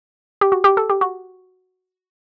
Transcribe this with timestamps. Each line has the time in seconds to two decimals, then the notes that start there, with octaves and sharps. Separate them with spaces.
0.41 G4
0.52 F#4
0.64 G4
0.77 A4
0.90 G4
1.01 F#4